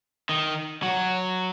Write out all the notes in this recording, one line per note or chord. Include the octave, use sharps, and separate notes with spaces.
D#3
F#3